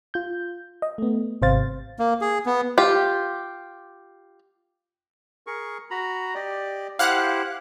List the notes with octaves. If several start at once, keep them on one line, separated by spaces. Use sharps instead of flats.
F4 G6
D#5
A3 B3
G#1 C3 C5 F5 A6
A#3
G#4
B3
F4 G4
G#4 A#4 C#6
F#4 A#5 B5
G4 D5 D#5
E4 G4 C5 F5 F#5 F#6